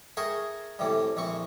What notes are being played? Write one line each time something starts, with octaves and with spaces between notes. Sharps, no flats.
G#4 A#4 E5 G5 C#6
A2 C3 E3 G3
A#1 E3 C4 C#6